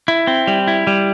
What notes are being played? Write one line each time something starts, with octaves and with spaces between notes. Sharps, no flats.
E4
C4
G3
E4
G3